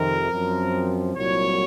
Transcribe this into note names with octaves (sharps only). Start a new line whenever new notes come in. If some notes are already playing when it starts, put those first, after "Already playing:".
Already playing: F2 C3 D#3 A#4
F#2 F3 C4
C2 A#2 F#3 C#5